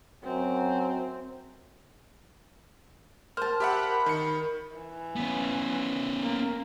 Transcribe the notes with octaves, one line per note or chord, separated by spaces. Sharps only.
F#2 C4
A#4 C5 A5 F6
G4 E5 F#5 B5
D#3 A#4 C#7
E3
B3 C#4
A#3